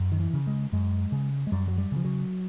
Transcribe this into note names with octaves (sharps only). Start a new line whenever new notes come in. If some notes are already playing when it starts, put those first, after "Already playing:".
Already playing: F#2
D#3
E3
C#3
G#3
F#2 G#3
C#3
G#3
F#2 G3
F#3
G3
C#3 F3
F#3